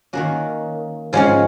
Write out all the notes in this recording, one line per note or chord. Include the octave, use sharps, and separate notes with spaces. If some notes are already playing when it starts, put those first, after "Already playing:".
D#3 A#3 C#4 F#4
G#2 F3 G#3 C#4 C#5